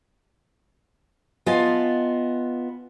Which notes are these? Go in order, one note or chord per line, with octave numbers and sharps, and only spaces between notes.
B3 F4 D#5 F5 G#5 A5